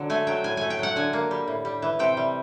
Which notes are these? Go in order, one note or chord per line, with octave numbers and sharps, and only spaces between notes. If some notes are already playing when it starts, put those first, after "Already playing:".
Already playing: D3 F#3
A3 G#5
F#3 G5
A2 G#5
A3 G#5
G5
F#3 F#5
D3 G#5
A#3
G3
A2
G3
E3
C3 G5
G3